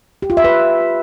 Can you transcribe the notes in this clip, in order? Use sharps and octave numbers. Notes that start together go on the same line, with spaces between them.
G4
F4
E5
B4